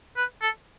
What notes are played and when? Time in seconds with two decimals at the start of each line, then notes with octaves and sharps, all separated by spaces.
0.17 B4
0.42 A4